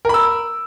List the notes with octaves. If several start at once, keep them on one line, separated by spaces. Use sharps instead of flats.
A#4 B5 E6